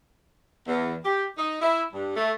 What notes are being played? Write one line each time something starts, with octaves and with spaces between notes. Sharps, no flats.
E2
G4
D#4
E4
G2
A3